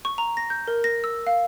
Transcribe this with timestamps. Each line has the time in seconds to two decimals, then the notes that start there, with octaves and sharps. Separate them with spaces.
0.05 C#6
0.18 A#5
0.37 A#6
0.50 G6
0.68 A#4
0.84 A#6
1.04 E6
1.27 F5